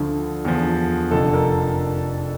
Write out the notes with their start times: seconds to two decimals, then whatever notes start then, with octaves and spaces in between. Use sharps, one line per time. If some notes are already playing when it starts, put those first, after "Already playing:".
Already playing: D2 D3 F3
0.45 E2 D3 F3
1.11 F1 F2 D3 F3 A4
1.34 A#4